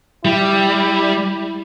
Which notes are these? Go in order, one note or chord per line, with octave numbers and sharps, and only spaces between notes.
G3 E4